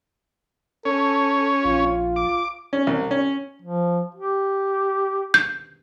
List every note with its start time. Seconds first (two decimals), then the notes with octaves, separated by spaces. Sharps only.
0.85 C#4 A4 C#5
1.65 A#1 F4
2.16 D6
2.73 C#4
2.87 C2
3.11 C#4
3.62 F3
4.15 G4
5.34 G6